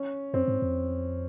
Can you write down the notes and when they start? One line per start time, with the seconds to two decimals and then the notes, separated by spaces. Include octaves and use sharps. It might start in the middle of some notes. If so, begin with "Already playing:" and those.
Already playing: C#4
0.34 F#2 C4
0.48 G#2
0.62 F2